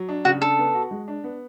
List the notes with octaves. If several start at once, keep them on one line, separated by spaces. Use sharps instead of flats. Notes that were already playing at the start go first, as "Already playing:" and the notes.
Already playing: F#3
D4
C#3 F#4
D4 A4
B3
F#4
G#3
D4
B3